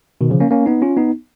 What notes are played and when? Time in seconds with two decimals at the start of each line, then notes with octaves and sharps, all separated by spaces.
0.21 B2 D#3
0.30 C#3 F3
0.40 A#3 C#4
0.51 A#3 C#4
0.66 B3 D#4
0.82 C#4 F4
0.97 B3 D#4